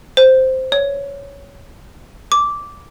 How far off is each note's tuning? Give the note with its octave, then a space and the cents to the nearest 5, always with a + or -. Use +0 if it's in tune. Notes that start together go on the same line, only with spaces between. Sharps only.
C5 -5
C#5 +15
D6 -10